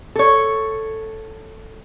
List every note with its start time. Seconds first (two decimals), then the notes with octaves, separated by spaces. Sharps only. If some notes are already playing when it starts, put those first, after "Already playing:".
0.15 A4 C#5